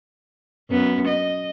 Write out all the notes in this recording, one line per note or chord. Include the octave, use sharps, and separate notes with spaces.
F#2 B3
D#5